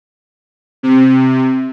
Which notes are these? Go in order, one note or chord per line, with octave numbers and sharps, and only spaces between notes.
C3